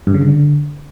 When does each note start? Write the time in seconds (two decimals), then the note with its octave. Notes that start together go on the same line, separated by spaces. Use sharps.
0.07 G2
0.14 C#3
0.21 D3